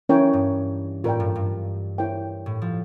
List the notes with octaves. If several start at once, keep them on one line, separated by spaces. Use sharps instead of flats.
E3 C#4 E4 A#4 C#5 G5
G2
A2 F4 A#4 D5 G5
G2
G2
E4 A#4 C#5 G5
A2
F3